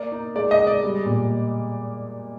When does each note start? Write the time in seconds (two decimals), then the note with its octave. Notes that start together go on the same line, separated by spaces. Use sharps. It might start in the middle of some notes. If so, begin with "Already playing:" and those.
Already playing: A#3 D5
0.12 D#4
0.35 G#3 D5
0.51 D#5
0.59 G#3
0.67 D5
0.83 G3
1.06 A#2